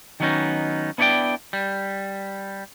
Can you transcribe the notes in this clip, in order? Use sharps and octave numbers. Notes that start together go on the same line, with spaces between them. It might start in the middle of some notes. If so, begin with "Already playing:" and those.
D#3 F#3 A3 B3 C#4 D#4
B3 D4 E4 C#5 D5 G5
G3